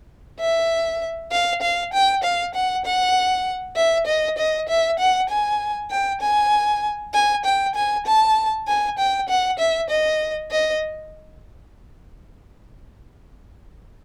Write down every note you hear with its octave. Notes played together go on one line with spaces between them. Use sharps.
E5
F5
F5
G5
F5
F#5
F#5
E5
D#5
D#5
E5
F#5
G#5
G5
G#5
G#5
G5
G#5
A5
G#5
G5
F#5
E5
D#5
D#5